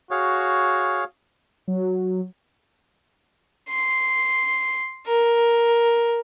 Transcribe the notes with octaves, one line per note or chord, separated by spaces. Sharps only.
F#4 G#4 C#5 F5
F#3
C6
A#4